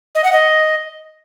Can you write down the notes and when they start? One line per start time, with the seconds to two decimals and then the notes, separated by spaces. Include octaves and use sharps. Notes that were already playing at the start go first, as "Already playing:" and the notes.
0.15 D#5
0.24 F#5
0.33 D#5